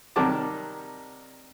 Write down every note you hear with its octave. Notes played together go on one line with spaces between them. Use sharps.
C3 D#3 F#3 G3 A5 D6